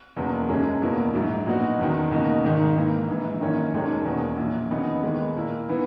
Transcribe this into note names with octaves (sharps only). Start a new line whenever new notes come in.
F#1 E2 B2 A#3
F#1 F#2 C#3 G#3 C#4
E2 B2 A#3 E4
A#1 G#2 F#3
A#2 F#3 B3 D#4 F#4
F#1 E2 D#3
C#2 B2 A#3 D#4 F#4
G#1 G#2 D#3
G#2 E3 A#3
A#1 G#2 E3
F#2 D#3 A#3 C#4
E1 D#2 D#3 G#3 C#4
E2 B2 A#3 C#4
A#1 A#2 F#3
D#2 C#3 E3 B3 D#4
D#2 D#3 G#3 B3
A#2 A#3 E4
E3 B3